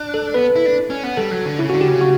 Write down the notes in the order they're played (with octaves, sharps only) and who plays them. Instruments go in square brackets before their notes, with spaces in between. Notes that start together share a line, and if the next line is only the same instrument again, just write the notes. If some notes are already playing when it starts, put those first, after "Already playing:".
Already playing: [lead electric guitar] D4
[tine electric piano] A4
[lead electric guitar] B3 [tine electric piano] B4
[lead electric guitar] E4
D4
C#4
B3
[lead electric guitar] G3 [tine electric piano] A4
[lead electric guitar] F#3
D3
[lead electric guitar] C#3 [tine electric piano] E4
[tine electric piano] F#4
[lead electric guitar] D3
[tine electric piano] G4
[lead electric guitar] C#3
[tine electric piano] F#4